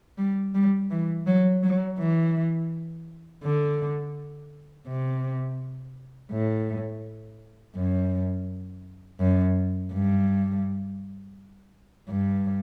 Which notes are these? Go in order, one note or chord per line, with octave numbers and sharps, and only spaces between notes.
G3
G3
E3
F#3
F#3
E3
D3
C3
A2
F#2
F#2
G2
G2